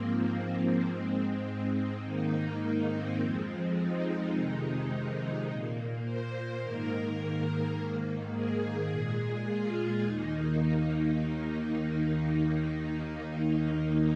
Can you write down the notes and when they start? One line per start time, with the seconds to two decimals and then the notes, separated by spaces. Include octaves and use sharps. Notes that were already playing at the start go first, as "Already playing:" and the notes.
Already playing: G#2 F3 A#3 C4
0.89 G#2 G#3 C4
1.46 C4
2.03 G#2 D#3 A#3 D#4
2.61 D#4
2.89 C4
3.18 F2 F3 G#3 C4
3.76 D#4
4.32 F2 C3 D#3 G#3 D#4
5.47 A#2 A#3
6.04 C5
6.61 G#2 D#3 A#3 A#4
7.75 G#2 D#3 A#3
8.31 G#4
8.89 A#2 G#3
9.47 F4
10.03 D#2 D#3 A#3 D#4